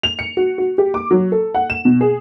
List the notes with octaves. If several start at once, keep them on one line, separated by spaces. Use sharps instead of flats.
F7
C#7
F#4
F#4
G4
D6
F#3
A4
F#5
E7
B2
G#4